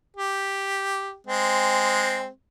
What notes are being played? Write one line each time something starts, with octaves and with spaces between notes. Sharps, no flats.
G4
G#3 C4